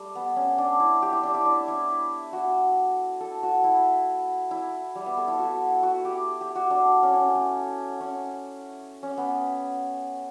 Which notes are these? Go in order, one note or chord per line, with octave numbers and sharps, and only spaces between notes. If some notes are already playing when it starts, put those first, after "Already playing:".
Already playing: G3 A3
B3
C#4
D4
E4
G4
E4
D4
E4
D4
E4
F#4
A4
F#4
E4
E4
G3
B3
A4
E4
F#4
F#4
G4
G4
F#4
D4
C#4
C#4
A3
C#4
C#4
B3